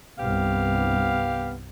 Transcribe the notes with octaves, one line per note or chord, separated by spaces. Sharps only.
C2 G2 B3 G4 F5